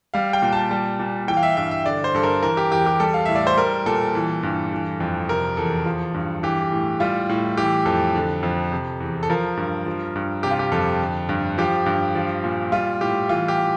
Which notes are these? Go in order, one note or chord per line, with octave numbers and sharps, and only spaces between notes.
G3 F5
G5
A#2
A5
G3
A#2
E3 G5
F5
E5
G2 E5
E5
D3 D5
C5
G2 A4
A#4
E3 A#4
G4
E2 G4
G4
G3 A4
F5
A2 E5
D5
C5
G3 A#4
A#2 A4
E3
G2
E3
F2
C3 A#4
E2 A4
F3
G2
E3 G4
A2
G3 F4
A2
E3 G4
F2 A4
D3
F2
C3
E2
A4
F3 A#4
G2
F3
G2
C3 G4
F4
G4
F2 A4
D3
G2
F3 G4
G2
F3
A#2
G3 F4
A2 G4
E3 F4
G4